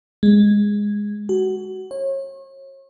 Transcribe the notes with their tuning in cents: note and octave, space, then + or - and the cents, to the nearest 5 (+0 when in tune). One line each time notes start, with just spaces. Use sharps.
G#3 -10
F#4 +20
C#5 -35